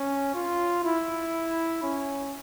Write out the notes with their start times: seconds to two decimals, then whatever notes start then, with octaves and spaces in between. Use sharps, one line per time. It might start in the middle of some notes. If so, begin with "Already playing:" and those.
Already playing: C#4
0.34 F4
0.84 E4
1.83 C#4